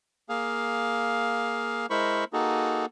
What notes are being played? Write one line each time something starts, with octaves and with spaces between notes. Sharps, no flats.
A#3 G#4 F5
G#3 E4 A#4 C5 B5 C#6
A#3 D#4 F#4 G#4 A4